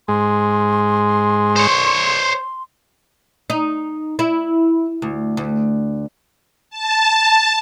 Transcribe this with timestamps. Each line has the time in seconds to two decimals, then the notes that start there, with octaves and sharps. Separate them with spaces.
0.08 G#2 G#3 C6
1.56 C5 C#5
3.50 D#4
4.19 E4
5.02 D2
5.37 D2
6.70 A5